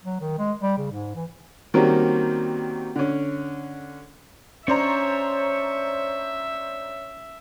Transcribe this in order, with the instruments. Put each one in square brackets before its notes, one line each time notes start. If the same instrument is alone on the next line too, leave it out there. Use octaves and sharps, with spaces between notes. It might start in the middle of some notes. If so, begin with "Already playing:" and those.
[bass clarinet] F#3
D#3
G#3
G3
C#3
G#2
E3
[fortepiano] D#3 F#3 G3 A#3 C4 C#4
D3 C#4
[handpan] C#4 [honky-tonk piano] D4 C5 A#5 [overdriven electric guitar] C#5 [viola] E5